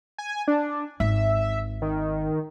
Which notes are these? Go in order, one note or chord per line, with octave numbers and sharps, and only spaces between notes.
G#5
D4
G#1 E5
D#3